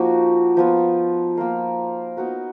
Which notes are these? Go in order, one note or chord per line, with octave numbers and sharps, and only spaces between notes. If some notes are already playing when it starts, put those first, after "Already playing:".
Already playing: F3 A#3 D#4 F#4
F3 B3 F4
A#3 F4 A#4 F5
B3 D#4 F#4 A#4